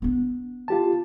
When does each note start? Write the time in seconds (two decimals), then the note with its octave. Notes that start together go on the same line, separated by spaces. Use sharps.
0.02 B3 D4
0.68 F4 G4 A5